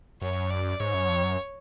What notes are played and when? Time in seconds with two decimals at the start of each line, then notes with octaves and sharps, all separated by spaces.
0.22 F#2 C#5
0.50 D5
0.79 G#2 C#5
0.94 F#2
1.09 F2
1.24 F#2